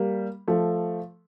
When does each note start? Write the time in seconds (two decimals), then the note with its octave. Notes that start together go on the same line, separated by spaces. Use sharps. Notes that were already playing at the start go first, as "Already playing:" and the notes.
Already playing: G3 A#3
0.48 F3 A3